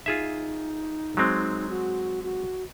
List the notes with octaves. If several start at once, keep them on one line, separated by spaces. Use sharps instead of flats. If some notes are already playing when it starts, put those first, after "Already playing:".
D#4 F4 G#4 E5
F#3 G#3 C4
F#4
F#4